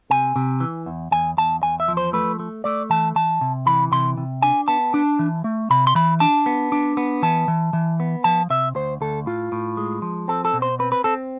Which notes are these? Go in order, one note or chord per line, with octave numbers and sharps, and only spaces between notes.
C3 G#5
C3
E3
E2
E2 G#5
E2 A5
E2 G#5
E5
F3
C5
A3 B4
A3
A3 D5
E3 A5
E3 A5
C3
E3 B5
C3 C6
C3
D4 G#5
B3 A5
D4
E3
A3
C3 B5
C6
E3 B5
D4 A5
B3
D4
B3
E3 A5
E3
E3
B3
F3 A5
C3 E5
D2 C5
D2 A4
A2 F4
A2
G#3
F3
C4 A4
A4
B2
C5
C4 B4
B4
C4 A4